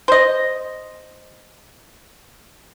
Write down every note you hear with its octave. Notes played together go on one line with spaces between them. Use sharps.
C5 D#5